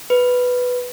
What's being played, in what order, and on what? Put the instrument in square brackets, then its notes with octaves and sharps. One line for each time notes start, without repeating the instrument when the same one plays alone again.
[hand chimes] B4